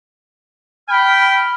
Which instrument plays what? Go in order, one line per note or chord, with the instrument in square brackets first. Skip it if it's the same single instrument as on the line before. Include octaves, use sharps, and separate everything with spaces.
[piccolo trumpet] G5 [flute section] B5 F6